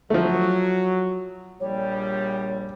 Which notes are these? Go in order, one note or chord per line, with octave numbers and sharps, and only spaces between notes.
F3 F#3 A3
A#1 G3 C#5